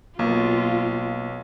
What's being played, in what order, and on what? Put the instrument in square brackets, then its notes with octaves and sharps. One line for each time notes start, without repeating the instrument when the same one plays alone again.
[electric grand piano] B1 [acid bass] A#3 [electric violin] F4